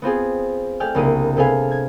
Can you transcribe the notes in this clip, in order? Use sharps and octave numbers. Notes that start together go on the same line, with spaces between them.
B3 C4 F4 G#4
A3 D5 G5 G#5 F6
C2 C#3 A#3 D4 E4 D#7
C3 G#4 A4 B4 F5 G#5
G#6